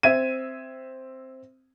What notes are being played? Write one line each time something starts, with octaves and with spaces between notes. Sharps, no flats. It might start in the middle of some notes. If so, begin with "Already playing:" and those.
C4 E5 G#6 D#7